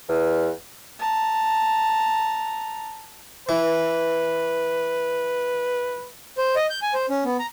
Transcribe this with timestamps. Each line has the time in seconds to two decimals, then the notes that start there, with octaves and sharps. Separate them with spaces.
0.08 E2
0.99 A5 A#5
3.49 E3 B4
6.38 C5
6.56 D#5
6.70 G6
6.82 G#5
6.94 C5
7.10 C#4
7.25 B3
7.39 A#5